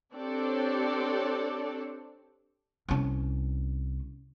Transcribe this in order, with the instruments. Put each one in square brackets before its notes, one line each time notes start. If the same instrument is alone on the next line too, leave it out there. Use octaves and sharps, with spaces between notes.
[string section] C4 D4 G4 A4 C#5 D5
[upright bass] C2 C#4